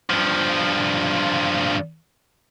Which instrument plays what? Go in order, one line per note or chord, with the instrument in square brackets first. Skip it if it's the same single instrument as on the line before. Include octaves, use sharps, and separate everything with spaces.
[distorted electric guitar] G2 F3